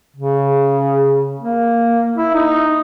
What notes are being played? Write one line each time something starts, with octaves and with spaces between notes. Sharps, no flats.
C#3
A#3
E4
D#4